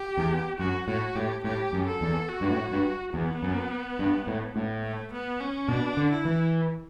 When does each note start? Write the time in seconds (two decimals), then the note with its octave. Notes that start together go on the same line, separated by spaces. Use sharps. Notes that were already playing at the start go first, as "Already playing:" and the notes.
Already playing: G4
0.18 E2
0.59 F#2 F#4
0.87 A2 F#4
1.16 A2 G4
1.44 A2 G4
1.73 F#2
1.87 A4
2.01 E2
2.29 F#4
2.41 G2
2.50 A2
2.71 G2
3.14 E2 B3
3.43 F#2
3.99 G2
4.27 A2
4.56 A2
4.84 A3
5.13 B3
5.40 C#4
5.68 B2 D4
5.97 D3
6.11 E4
6.25 E3